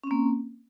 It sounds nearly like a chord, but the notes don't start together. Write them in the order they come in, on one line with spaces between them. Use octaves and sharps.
C#4 C4 A#3